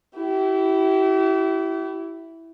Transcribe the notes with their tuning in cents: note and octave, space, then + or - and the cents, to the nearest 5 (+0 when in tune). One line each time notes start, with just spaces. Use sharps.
E4 +0 G4 -40